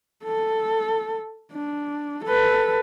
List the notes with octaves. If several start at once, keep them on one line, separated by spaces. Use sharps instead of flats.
A4
D4
A4 B4